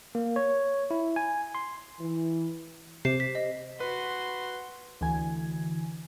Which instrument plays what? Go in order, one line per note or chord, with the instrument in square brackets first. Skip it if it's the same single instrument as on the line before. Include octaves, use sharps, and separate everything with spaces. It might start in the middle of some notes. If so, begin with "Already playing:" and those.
[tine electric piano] A#3
C#5
E4
G#5
C6
[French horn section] E3
[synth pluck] C3 [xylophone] G4 C5 C7
[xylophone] B6
D#5
[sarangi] F#4 [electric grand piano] B4 [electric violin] C6
[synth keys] D2 E3 G#5